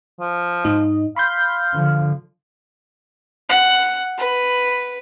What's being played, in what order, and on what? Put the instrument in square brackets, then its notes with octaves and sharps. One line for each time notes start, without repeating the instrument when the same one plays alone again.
[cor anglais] F3
[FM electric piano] G#2 D#4 D#5
[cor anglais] F5 [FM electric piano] B5 C6 G6
[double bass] D3 F3
[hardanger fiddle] F#5
B4